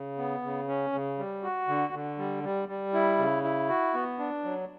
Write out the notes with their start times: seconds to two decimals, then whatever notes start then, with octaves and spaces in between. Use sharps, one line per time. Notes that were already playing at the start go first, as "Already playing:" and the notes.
Already playing: C#3
0.18 B3
0.42 C#3
0.68 C#4
0.93 C#3
1.18 G3
1.43 F#4
1.68 D3
1.93 D3
2.18 G3
2.43 G3
2.68 G3
2.93 E4
3.18 C#3
3.44 E4
3.69 F#4
3.94 B3
4.19 D4
4.44 F#3